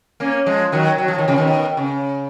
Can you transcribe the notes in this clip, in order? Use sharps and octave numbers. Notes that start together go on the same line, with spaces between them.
A#3 C#4
F3 G#3
D#3 F#3
F#3
F3
D#3
C#3 F3
B2 D#3
C#3